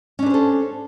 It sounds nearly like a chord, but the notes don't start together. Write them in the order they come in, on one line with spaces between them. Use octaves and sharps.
C#4 D4 B4 C5 A4